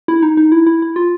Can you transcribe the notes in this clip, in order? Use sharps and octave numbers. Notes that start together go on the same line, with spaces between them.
E4
D#4
D#4
E4
E4
E4
F4